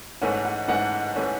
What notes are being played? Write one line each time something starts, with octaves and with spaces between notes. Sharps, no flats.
G#2 E3 A3 C#4 F#5
F#5
G#2 E3 A3 C#4 F#5
E3 A3 C#4